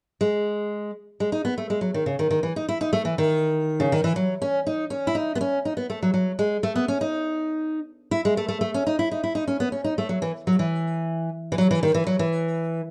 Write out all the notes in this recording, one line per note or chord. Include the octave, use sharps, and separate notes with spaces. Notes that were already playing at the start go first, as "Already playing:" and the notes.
G#3
G#3
D#4
B3
A3
G#3
F#3
D#3
C#3
D#3
D#3
E3
D#4
E4
D#4
A3
E3
D#3
C#3
D#3
E3
F#3
C#4
D#4
C#4
E4
D#4
B3
C#4
D#4
B3
A3
F#3
F#3
G#3
A3
B3
C#4
D#4
E4
G#3
A3
A3
A3
C#4
D#4
E4
D#4
E4
D#4
C#4
B3
C#4
D#4
A3
F#3
E3
F#3
E3
E3
F#3
E3
D#3
E3
F#3
E3